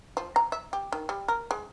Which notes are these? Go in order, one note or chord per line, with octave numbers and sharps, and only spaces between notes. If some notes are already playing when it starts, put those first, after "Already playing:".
F3
A#5
E5
G4
D#3
G3
A#4
G#3